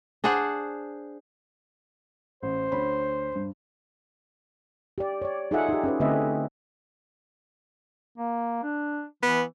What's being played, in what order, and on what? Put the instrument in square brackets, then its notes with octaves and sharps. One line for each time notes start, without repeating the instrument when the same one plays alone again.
[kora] D4 G#4 C5 F#5
[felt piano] A1 [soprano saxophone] C5
[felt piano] D2 C#5 B5
G2
[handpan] G4 D5
C#5 D5
D#4 F4 G#4 A4 E5 F#5
D#4 G4
C#4 G#4 B4
D3 A3 C4 B4 D#5 E5
[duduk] A#3
D4
[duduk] E3 [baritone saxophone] B3